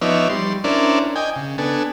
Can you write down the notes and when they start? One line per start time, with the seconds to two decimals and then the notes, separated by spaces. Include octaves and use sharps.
0.01 F3 B3 D#4 C#5 D5 E5
0.30 G3 C6
0.64 C#4 D4 E4 A#4 C5 D5
1.16 D#5 G5 G#5
1.36 C#3
1.58 B3 D4 A4 G#5